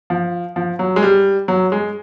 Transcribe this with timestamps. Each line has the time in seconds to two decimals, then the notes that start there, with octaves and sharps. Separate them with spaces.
0.10 F3
0.56 F3
0.79 F#3
0.96 G#3
1.03 G3
1.48 F#3
1.72 G#3